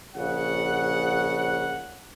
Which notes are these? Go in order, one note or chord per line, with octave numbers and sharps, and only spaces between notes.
A#1 C#3 F#5